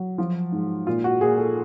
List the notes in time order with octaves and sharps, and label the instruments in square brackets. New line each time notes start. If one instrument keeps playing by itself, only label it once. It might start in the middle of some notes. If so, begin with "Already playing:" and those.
Already playing: [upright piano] F#3
F3
G#2
A#2 F4
F#4
A#2 G#4
A4